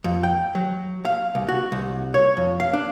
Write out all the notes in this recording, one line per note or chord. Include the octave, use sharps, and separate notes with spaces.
F2
G5
F#3
F5
C2
F#4
C2
C#5
F2
F5
D4